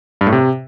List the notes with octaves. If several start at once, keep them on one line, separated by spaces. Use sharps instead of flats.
G2
A2
C3